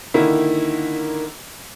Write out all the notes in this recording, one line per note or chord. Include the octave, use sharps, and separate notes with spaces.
D3 D#3 A#3 E4